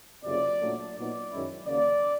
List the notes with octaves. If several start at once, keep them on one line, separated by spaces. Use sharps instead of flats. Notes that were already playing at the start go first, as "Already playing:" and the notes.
F#1 F2 C3 D5
A#2 F#3 A3 D4
A#2 F#3 B3 D#4 D5
F#2 D#3 G#3 C#4 E4
D#2 C#3 F#3 A#3 D5